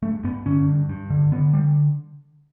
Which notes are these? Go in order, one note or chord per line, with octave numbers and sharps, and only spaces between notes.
G2 A3
G2 B3
D3 C#4
G2
G2
D3
D3 B3
D3 G3